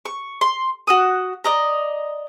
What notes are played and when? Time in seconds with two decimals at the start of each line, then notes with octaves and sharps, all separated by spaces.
0.05 C#6
0.41 C6
0.87 F#4 F#5 D#6
1.44 D5 D#5 A#5